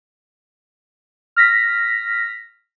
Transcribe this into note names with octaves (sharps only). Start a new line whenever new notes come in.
F6 A#6 B6